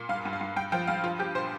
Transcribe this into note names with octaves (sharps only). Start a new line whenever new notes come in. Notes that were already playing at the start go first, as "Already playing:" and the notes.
Already playing: A#2
G2 F5
G2
F5
G2
G2 G5
F3 G5
G2 F5
F3 F4
F3 G4
A#2 C5